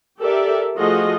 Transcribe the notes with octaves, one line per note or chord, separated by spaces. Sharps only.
G4 A4 A#4 D5 E5
F3 A3 F4 F#4 G#4 D#5